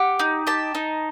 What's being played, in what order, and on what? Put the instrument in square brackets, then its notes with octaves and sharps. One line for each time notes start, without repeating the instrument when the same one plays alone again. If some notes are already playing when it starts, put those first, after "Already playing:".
Already playing: [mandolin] G4 F#5
D#4
G4 A5
D#4